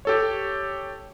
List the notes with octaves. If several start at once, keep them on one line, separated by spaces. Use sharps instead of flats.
G4 A4 C#5